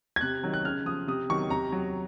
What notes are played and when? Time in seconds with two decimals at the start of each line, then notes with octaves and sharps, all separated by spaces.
0.16 G#6
0.21 C3 F#6
0.43 D#3 F#3
0.54 F#6
0.65 C#3 F6
0.86 F3 D#6
1.07 C3 D#6
1.30 D#3 F#3 C#6
1.50 C3 A#5
1.72 F#3